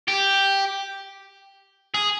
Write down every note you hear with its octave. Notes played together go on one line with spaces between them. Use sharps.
G4
G#4